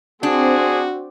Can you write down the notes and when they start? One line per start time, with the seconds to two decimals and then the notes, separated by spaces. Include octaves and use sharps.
0.23 C4 D4 F#4 G#4